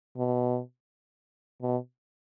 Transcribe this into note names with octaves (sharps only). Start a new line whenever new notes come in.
B2
B2